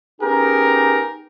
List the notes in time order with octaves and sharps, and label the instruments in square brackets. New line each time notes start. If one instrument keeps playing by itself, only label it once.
[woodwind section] B3 C#4 D#4 [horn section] G4 G#4 A#4